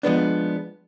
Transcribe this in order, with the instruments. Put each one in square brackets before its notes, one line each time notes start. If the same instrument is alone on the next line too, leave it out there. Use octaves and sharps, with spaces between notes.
[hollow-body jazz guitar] F3 G#3 B3 D4